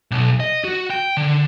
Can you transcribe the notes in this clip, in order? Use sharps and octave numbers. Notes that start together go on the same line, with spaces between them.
B1
D#5
F#4
G5
D3